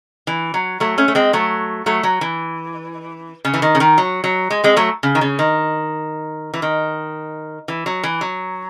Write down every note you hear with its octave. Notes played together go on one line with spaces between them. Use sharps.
E3
F#3
F#3 A3
A3 C#4
A3
G#3 C4
F#3 A3
F#3 A3
F#3
E3
C#3
E3
D#3
C#3
D#3
F#3
F#3
G#3
G#3 C4
F#3 A3
C#3
D#3
C#3
D#3
E3
D#3
E3
F#3
E3
F#3